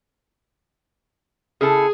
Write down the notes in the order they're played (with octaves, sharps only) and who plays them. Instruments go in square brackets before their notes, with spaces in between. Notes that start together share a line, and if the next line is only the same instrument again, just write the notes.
[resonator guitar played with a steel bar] C#3 E4 A4 [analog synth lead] G#4